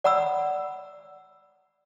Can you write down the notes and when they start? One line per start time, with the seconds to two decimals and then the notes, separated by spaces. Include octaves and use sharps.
0.04 D5 F#5 A#5 B5 E6